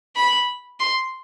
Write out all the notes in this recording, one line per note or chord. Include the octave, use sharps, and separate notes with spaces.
B5
C6